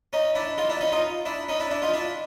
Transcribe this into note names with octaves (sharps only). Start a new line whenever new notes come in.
C#4 D#4
D4 E4
D#4 F4
D4 E4
C#4 D#4
D#4 F4
D4 E4
C#4 D#4
D4 E4
D4 E4
D#4 F4
D4 E4